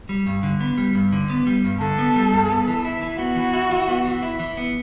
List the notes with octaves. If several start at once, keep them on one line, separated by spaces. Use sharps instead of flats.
G3
G2
D3
B3
G3
G2
D3
B3
G3
G2
D3 A4
B3
G3
G2
B3
E3
E4
E3
B3 F#4
E3
E4
E3
B3
E3
E4
E3
B3